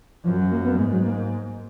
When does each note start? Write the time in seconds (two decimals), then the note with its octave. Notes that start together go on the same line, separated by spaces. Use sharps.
0.24 F#2 F3
0.38 F#3
0.51 A#3
0.64 B3
0.77 G#2 G#3
0.91 F#3
1.05 A#3